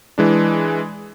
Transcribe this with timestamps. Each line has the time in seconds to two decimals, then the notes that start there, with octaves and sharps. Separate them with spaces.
0.18 E3 G#3 D4